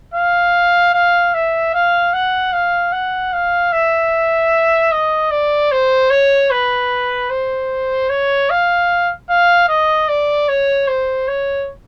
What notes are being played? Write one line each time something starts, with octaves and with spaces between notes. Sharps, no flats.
F5
F5
E5
F5
F#5
F5
F#5
F5
E5
D#5
D5
C5
C#5
B4
C5
C#5
F5
F5
D#5
D5
C#5
C5
C#5